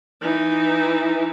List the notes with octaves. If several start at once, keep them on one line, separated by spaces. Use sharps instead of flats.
E3 D#4